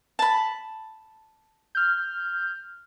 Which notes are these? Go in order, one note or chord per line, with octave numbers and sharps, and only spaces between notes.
A5 B5
F6 G6